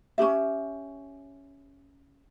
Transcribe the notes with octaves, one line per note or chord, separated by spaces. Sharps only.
C#4 D#4 G4 E5